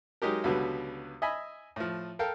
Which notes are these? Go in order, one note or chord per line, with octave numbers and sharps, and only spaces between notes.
F#3 G#3 D#4 G4 A#4
C#2 B2 D3 F#3 G3 B3
D#5 E5 G#5 B5
A2 F3
A4 A#4 F5 G5